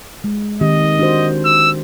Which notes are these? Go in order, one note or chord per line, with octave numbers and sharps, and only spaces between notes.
G#3
D#3 C4 G4 D#5
D4 F#4 C5
E6